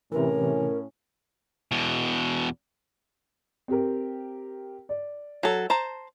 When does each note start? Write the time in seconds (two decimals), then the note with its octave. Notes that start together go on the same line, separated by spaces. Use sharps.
0.12 A2 C3 E3 C#4 A#4
1.72 E2 B2
3.68 C4 G4 A#4
4.89 D5
5.43 F#3 A4
5.70 C5 A5 A#5